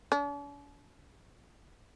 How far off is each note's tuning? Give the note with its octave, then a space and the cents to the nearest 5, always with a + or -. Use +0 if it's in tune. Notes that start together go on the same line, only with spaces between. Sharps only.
D4 -45